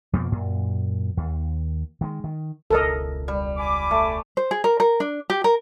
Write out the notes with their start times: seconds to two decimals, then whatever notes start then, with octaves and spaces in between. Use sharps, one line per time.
0.13 F2 B2 F3 A#3
0.32 F#2 A#2
1.17 D#2
2.01 D#3 G#3
2.24 D#3
2.70 E1 C#2 A4 A#4 D#5
3.28 G3
3.57 G#5 B5 D6
3.91 A3
4.37 C5
4.51 G#4
4.64 A#4
4.80 A#4
5.00 D4
5.30 G4
5.44 A#4